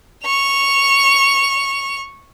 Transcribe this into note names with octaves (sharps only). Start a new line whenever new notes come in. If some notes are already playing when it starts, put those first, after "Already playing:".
C#6 F7